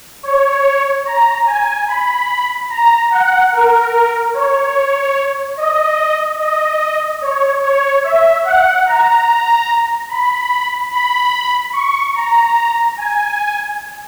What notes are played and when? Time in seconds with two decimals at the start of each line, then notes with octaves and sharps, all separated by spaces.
0.23 C#5
1.05 A#5
1.46 G#5
1.88 B5
2.70 A#5
3.11 F#5
3.52 A#4
4.34 C#5
5.57 D#5
6.39 D#5
7.21 C#5
7.63 C#5
8.04 E5
8.44 F#5
8.86 A#5
10.09 B5
10.91 B5
11.73 C#6
12.14 A#5
12.97 G#5